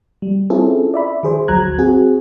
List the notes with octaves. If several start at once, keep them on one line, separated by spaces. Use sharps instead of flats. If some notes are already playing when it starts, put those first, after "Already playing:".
G3
C4 C#4 E4 F4 G#4 A4
D5 E5 B5
D#3 G#4 C5
G#1 D2 F#3 A#5 F#6 G#6
C4 F#4 G#4